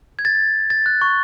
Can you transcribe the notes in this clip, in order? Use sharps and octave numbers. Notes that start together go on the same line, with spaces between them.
G#6
A6
A6
F#6
C#6